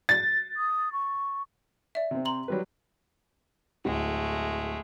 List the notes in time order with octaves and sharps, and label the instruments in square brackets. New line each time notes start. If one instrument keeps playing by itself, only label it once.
[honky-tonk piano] A6
[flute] D#6
C#6
[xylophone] D5 E5
[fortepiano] C3 C4
[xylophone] A#5 C6 F#7
[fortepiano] F#3 G3 B4
[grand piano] D1 [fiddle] G#3 A3